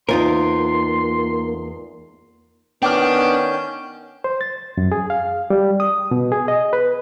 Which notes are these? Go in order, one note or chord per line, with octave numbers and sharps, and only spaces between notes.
E2 A#3 D#4 F4 A#4 C5 C6
D#3 B3 C#4 D4 G5 D6 F6 G6
C5
A6
F#2
G#4
F5
G3
D#6
B2
G#4
D#5
B4